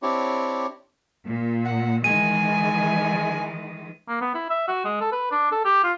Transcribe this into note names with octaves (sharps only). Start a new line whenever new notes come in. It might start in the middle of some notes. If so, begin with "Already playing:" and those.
C4 D4 E4 G4 C#5
A#2
F#5
D#3 E3 G#3 G#5 D#7
A#3
B3
E4
E5
F#4
G#3
A4
B4
D4
A4
G4
F4